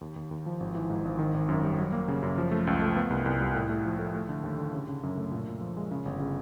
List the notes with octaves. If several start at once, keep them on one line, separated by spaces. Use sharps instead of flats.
D#2
D#2
D#2
F3
G#1
E3
G#2
G#1
D#3
G#1
F#2
G3
F#3
A#3
C#3
F#2
F3
A3
C#2
A3
B3
C2
C2
G3
A2
A3
F3
A3
A3
D3
D#2
D3
C#3
C#3
F#2
A3
A#2
A#2
F3
G#3
C#3
G1
C#3